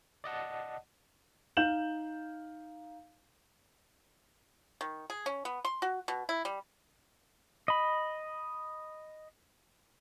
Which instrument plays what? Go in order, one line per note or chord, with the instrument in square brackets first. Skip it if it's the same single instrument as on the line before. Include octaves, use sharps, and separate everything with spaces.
[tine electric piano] D5 D#5 F#5 A5
[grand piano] D#4 F5 G6 E7 F#7
[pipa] D#3
G#4
C#4
B3
C6
F#4
B2
E4
G3
[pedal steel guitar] D#5 B5